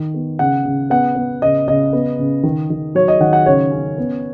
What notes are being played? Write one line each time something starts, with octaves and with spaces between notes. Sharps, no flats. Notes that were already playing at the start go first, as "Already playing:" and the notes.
Already playing: D#3
B3
C#3 F#5
C#3
B3 F#5
B3
C#3 D#5
C#3 D#5
B3
C#3
D#3
D#3
F#3 C#5
D#5
D#3 F#5
F#5
C#3 C#5
C#4
B3